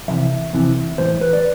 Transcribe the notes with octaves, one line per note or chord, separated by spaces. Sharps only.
F2 C3 E3 E5
F2 C3 E3
A2 E3 C5
B4
D5